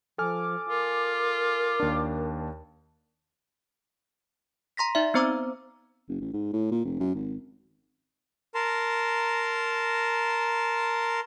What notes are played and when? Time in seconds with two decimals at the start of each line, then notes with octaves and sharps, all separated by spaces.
0.18 F3 A4 G#5 D6 F6
0.70 F4 A#4
1.80 D#2 D4
4.77 A#5 C6 A#6 B6
4.95 D#4 D5 E5
5.14 B3 C4 C5 A#5 D6 E6
6.08 F#1
6.21 A1
6.33 G#2
6.53 A2
6.71 A#2
6.85 F1
7.00 F#2
7.15 G#1
8.55 A#4 A5 A#5 C6